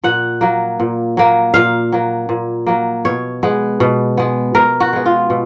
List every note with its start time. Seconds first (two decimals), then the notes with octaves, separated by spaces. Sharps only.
0.04 A#2 F#5
0.41 F#3 A#3
0.80 A#2
1.17 F#3 A#3
1.54 A#2 F5
1.92 F#3 A#3
2.29 A#2
2.66 F#3 A#3
3.05 B2 C#5
3.43 G#3 B3
3.80 B2
4.17 G#3 B3
4.54 B2 A#4
4.80 F#4
4.93 G#3 B3
5.06 F4
5.30 B2